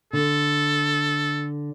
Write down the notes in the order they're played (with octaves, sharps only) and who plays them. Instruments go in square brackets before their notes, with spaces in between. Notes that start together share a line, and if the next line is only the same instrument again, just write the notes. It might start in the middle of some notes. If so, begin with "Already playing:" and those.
[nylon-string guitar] D3 [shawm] A4